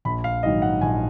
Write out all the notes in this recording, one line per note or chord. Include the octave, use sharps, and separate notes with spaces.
A#1 B5
F5
G#2 D#3 F#3 D#5
F#5
A#1 G#5